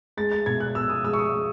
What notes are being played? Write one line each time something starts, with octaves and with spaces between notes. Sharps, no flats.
G#3 A6
A6
B2 G#6
F#6
B2 E6
D#6
G#3 E6
C#6
D#6
G#3